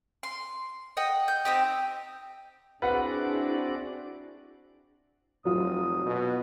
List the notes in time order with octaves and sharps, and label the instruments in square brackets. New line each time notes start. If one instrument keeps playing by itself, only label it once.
[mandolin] C6
D#5 F#5 G5
G6
C4 D#4 G4
[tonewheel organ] C4 F#4 D5 [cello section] D4 E4 G#4 [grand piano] B4 F#5
[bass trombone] F1 [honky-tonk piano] F#3 F4 [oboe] D#6
[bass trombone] B2